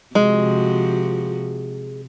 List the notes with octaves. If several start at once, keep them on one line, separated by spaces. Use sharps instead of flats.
C3 F3 G#3 F#4